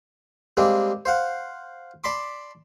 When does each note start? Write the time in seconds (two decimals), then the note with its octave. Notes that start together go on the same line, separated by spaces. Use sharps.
0.57 G3 G#3 A#3 C4 D4
1.05 C5 F5 F#5
2.04 D5 A5 B5 C6 D6